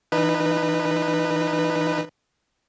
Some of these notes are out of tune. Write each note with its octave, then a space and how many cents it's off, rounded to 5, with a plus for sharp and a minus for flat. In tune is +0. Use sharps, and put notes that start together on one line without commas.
E3 +0 D#4 -35 B4 -5